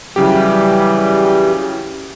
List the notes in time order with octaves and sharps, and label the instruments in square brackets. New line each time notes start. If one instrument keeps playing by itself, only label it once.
[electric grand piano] C#3 F#3 G4 [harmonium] E3 G3